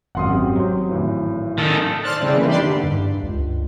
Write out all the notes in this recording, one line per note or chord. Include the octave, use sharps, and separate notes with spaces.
G#1 F#2 F5 F#5 C6 D#6
C4 G4
F#3 C5
G#1 A2 E3
D#3 A4
C5 D5 A5 F6 F#6 A6
C#3 G3 C4 E4
E3 A#3 B4
D4 D#4 G4 B4 D5 C6
G2 D3
G2
C#2